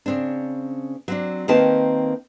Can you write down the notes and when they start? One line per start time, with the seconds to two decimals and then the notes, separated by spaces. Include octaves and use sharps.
0.06 C#3 C4 D4
1.08 F#3 C4 D4
1.48 D#3 A#3 C4 D#4 B4 A5